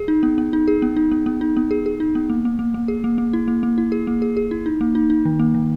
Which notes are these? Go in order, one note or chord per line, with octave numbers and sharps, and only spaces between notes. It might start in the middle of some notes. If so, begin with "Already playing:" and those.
Already playing: G#4
D#4
B3
B3
D#4
G#4
B3
D#4
B3
B3
D#4
B3
G#4
G#4
D#4
B3
A#3
A#3
A#3
A#3
G#4
A#3
A#3
E4
A#3
A#3
E4
G#4
A#3
G#4
G#4
E4
D#4
A#3
D#4
D#4
D#3
A#3
D#3